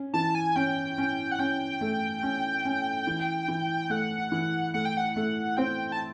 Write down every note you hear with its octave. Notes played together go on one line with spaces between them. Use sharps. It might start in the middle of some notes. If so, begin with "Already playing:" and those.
Already playing: C#4
E3 A5
G#5
C#4 G5
C#4
F#5
C#4 G5
A3
C#4
C#4
E3
E3
A3 F#5
E3
A3 F#5
G5
F#5
A3
C4 G5
A5